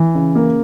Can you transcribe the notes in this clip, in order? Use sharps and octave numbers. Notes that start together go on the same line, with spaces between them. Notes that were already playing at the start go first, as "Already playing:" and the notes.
Already playing: E3
C#3
A#3